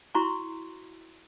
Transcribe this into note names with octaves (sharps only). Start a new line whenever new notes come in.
E4 F#4 A#5 C6 C#6